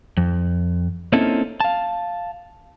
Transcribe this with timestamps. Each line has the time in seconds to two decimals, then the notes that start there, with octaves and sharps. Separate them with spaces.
0.17 F2
1.12 A#3 C4 C#4 D#4 E4 A4
1.60 F5 A5